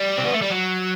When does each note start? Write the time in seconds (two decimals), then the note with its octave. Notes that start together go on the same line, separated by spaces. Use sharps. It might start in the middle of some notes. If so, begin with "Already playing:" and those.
Already playing: G3
0.18 C4
0.25 B3
0.33 A3
0.42 G3
0.50 F#3